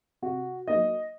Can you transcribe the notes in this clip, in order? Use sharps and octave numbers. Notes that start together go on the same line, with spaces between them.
C3 F#4
F#3 A#3 D#4 D#5